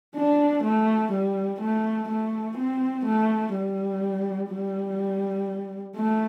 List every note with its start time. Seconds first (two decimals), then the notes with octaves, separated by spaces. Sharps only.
0.16 D4
0.64 A3
1.12 G3
1.61 A3
2.09 A3
2.57 C4
3.05 A3
3.54 G3
4.50 G3
5.96 A3